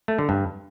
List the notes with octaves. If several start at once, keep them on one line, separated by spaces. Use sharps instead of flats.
A3
D3
G2